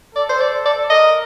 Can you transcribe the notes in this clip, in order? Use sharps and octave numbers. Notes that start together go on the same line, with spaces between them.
A4 D5
C5
D5
D5
A#4 D#5